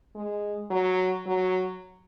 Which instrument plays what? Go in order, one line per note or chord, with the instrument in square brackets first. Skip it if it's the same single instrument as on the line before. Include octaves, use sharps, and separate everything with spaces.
[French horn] G#3
F#3
F#3